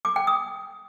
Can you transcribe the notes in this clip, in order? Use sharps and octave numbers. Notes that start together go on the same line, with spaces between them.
D6
G5
D#6